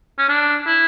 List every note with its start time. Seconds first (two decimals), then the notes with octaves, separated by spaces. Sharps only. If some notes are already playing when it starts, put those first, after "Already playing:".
0.19 C#4
0.29 D4
0.67 E4